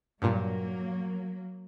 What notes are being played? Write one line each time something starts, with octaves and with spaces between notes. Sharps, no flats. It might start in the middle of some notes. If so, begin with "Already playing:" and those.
G2 A#2 F#3 A#3